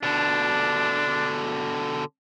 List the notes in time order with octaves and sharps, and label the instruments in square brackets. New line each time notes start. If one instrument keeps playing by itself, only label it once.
[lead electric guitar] B2 D3 [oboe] D4